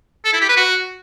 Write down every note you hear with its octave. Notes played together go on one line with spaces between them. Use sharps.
A4
E4
G4
B4
F#4